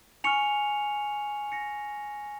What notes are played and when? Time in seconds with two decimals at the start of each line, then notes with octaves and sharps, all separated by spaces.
0.24 G#5 C#6 F6 C#7 F7
1.52 A#6 C#7